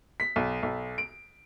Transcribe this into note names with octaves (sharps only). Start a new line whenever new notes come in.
B6
B1
B1
D7